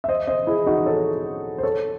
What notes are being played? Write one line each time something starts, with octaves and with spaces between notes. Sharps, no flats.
E5
C5 D#5
C5 D#5
E4 G#4
D#4 F#4
A4 C#5
C5
A4 C#5